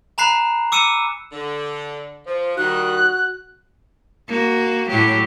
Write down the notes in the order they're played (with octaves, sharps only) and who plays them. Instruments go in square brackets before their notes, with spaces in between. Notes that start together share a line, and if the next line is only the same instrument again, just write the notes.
[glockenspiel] G#5 A#5 B5 F#6 C7
D6 E6 C#7 D#7 E7
[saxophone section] D3
[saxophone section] F3 [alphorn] C5
[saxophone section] D#3 G3 [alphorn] F#4 [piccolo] F#6
[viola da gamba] A#3 F#4
A2 F#3 G4